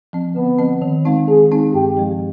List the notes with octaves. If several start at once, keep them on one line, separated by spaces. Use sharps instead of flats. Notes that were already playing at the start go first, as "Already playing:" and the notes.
F3 C4
D3 B3
F3 C4
D#3
G#3 C4 D#4
D#3 G#4
G#3 C4 D#4
G2 G4
F3 G#3